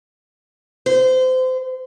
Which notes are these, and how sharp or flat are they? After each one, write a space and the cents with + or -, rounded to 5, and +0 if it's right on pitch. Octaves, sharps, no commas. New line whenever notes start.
C5 -30